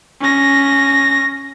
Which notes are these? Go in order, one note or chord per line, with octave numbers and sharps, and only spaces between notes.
C#4 A#6